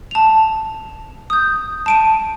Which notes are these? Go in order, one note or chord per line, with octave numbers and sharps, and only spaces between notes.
A5 F7
D#6 G6
A5 D7 D#7